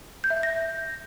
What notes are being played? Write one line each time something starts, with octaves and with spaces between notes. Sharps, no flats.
G6
E5
G6
A#6